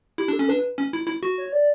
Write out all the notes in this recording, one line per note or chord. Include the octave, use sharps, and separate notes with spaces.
E4 G4
D4 A4
C#4
D4 B4
C#4
E4
E4
F#4
C#5
D5